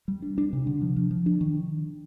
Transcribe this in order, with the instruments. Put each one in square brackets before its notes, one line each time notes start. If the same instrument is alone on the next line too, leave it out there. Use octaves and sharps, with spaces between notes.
[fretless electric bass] G3
D4
D4
C3
D3
F3
F3
F3
D4
D#3